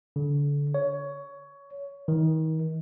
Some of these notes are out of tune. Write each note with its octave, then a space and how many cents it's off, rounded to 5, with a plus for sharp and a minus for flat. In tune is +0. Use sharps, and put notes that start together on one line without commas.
D3 -30
C#5 +15
D#3 +35